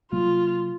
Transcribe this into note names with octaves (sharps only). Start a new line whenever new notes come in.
C3 F#3 A#3 F4